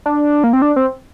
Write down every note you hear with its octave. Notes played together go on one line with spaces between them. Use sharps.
D4
A#3
C4
D4
C4